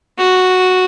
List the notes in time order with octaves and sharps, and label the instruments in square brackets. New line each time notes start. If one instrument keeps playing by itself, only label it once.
[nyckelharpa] F#4